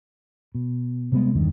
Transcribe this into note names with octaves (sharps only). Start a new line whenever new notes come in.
B2
C3 G3 G#3 B3
E2 G2 D#3